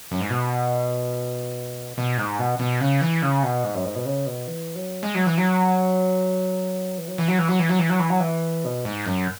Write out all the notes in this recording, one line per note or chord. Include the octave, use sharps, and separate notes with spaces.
F#2
G#2
B2
B2
G#2
B2
B2
C#3
E3
C#3
B2
G#2
F#2
G#2
B2
C#3
B2
E3
F#3
G#3
F#3
E3
F#3
E3
F#3
E3
F#3
E3
F#3
E3
F#3
E3
F#3
E3
F#3
E3
B2
G#2
F#2